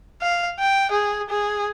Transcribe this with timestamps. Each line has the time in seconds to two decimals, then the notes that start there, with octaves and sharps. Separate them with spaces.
0.21 F5
0.59 G5
0.91 G#4
1.29 G#4